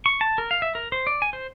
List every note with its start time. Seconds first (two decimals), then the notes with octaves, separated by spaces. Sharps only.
0.06 C#6
0.21 A5
0.38 A#4
0.51 F5
0.62 E5
0.75 A#4
0.92 C5
1.07 D5
1.22 G#5
1.33 C5